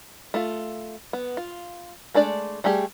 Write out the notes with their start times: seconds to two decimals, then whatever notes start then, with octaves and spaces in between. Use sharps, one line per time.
0.34 A3 F4
1.13 B3
1.37 F4
2.14 G#3 A3 D4 D5
2.64 G3 A3 G4 G#4